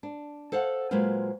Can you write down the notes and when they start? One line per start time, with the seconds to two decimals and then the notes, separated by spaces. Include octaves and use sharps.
0.03 D4
0.52 A4 C5 F5 F#5
0.91 A#2 F#3 G#3 B4 C5 F5